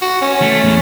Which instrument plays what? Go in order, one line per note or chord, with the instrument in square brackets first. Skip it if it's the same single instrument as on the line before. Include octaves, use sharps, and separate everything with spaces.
[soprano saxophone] F#4
C#4
[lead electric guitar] A3
E2